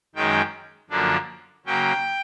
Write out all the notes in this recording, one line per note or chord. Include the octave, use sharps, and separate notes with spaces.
F#2 D#3 G#3 C#4 G5
F#2 D3 F3 A#3 D4
C#3 F#3 A#3 C#4 G5